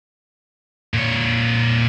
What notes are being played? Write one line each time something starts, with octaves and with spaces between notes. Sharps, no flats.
A#2 C#5